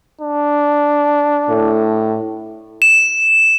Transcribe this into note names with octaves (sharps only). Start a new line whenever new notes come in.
D4
A2
E7